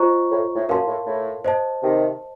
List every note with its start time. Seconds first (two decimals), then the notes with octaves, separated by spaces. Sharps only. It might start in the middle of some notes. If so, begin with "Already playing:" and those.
Already playing: F4 C5 D#5 A#5 C#6
0.31 A2
0.56 A2
0.69 F#2 A#4 F5 A5 C6
0.87 A2
1.06 A2
1.44 C5 D#5 A5
1.82 C3 D#3